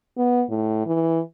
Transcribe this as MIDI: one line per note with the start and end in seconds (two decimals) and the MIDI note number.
0.18 0.43 59
0.49 0.84 45
0.86 1.20 52